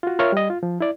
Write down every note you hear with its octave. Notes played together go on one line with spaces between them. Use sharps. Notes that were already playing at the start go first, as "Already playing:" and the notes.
F4 F#4
F4 A#4 C#5 E5 C#6 F6
G3 D#5
F4
F3
E4 D5